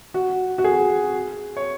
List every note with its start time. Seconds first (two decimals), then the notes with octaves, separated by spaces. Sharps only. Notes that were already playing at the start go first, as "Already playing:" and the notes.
0.14 F#4
0.58 F#4
0.64 G#4
1.57 C#5